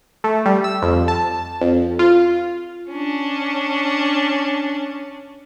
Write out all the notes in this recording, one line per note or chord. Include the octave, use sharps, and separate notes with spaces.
A3
G3
E6
F2
A5
F2
F4
C#4 D4